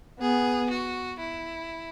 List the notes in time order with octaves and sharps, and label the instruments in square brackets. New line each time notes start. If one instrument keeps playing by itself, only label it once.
[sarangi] B3 [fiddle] G#4
[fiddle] F#4
E4